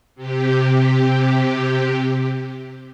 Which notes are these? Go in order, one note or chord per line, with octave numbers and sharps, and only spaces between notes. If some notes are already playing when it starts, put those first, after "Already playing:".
C3 G4